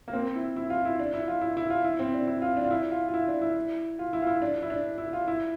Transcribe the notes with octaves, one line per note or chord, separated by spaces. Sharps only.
A#3
C4
E4
E4
F4
E4
D4
E4
F4
E4
E4
F4
E4
C4
D4
E4
F4
D4
F4
E4
F4
F4
E4
D4
E4
F4
E4
F4
E4
D4
E4
D4
E4
F4
E4